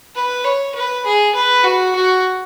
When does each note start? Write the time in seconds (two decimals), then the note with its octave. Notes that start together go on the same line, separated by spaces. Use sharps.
0.15 B4
0.44 C#5
0.75 B4
1.05 G#4
1.35 B4
1.64 F#4
1.95 F#4